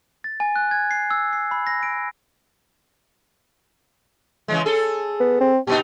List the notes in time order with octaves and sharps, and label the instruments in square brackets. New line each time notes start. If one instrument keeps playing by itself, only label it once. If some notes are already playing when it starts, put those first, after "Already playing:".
[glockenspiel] A6
G#5
F#6
G#6
C7
E6
C7
B5
A#6
D7
[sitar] C#3 E3 G#3
G#4 A4
[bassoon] B3
C4
[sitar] A#2 B3 D#4 [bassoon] G4